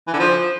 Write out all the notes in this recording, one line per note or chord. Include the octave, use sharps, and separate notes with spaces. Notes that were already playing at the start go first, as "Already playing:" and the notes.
E3
D3
F3